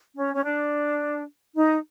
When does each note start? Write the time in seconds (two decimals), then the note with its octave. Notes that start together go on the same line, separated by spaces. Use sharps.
0.15 C#4
0.34 C#4
0.43 D4
1.56 D#4